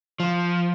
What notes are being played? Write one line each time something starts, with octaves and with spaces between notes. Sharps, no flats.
F3